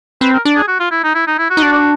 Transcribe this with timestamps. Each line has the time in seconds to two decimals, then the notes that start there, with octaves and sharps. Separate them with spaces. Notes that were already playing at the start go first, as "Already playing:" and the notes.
0.21 C4 B4
0.33 A#4
0.45 D4
0.56 G#4
0.68 F#4
0.80 F4
0.91 E4
1.04 D#4
1.15 E4
1.27 D#4
1.38 E4
1.50 F#4
1.57 D#4
1.62 D4